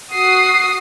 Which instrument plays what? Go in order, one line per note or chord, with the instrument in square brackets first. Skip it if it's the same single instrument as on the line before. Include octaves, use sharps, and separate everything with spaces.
[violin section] F#4 D#6 C7